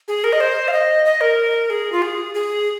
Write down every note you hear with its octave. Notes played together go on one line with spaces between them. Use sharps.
G#4
A#4
D#5
C5
F5
D#5
D#5
A#4
G#4
F4
G#4
G#4